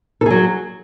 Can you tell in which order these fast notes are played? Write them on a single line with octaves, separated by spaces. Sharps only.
A4 G#4 F#3